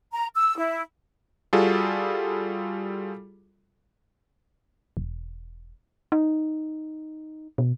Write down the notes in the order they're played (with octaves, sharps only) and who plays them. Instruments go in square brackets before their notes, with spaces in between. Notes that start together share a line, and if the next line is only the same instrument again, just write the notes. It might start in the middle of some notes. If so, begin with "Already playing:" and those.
[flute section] A#5
E6
E4
[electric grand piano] G3 F4 F#4 G#4 A4
[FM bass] E1
D#4
B2